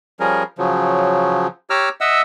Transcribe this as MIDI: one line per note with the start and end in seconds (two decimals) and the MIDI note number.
0.20 0.43 53
0.20 0.43 55
0.20 0.43 61
0.20 0.43 68
0.20 0.43 70
0.58 1.47 49
0.58 1.47 53
0.58 1.47 54
1.70 1.89 67
1.70 1.89 73
1.70 1.89 82
1.70 1.89 86
1.70 1.89 88
1.70 1.89 89
2.01 2.22 75
2.01 2.22 76
2.01 2.22 78
2.01 2.22 88